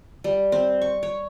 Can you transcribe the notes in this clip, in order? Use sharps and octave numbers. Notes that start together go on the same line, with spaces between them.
G3
C4
C#6
C#5